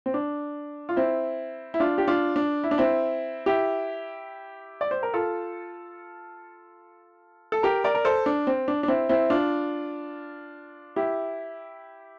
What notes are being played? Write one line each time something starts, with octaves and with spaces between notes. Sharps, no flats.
C4
D4
F4
C4 E4
E4
D4 F4
G4
D4 F4
D4
E4
D4
C4 E4
E4 G4
D5
C5
A#4
F4 A4
A4
G4 A#4
A#4 D5
A#4
A4 C5
D4
C4
D4
D4
C4 E4
C4 E4
D4 F4
E4 G4